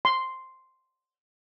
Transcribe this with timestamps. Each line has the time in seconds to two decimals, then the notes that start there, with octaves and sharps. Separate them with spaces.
0.05 C6